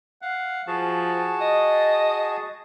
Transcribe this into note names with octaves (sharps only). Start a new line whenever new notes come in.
F5 F#5
F3 F#4 G#4 A5
D#5